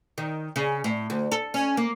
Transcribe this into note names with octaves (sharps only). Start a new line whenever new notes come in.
D#3
C#3
A2
D2
A4
C#4
A#3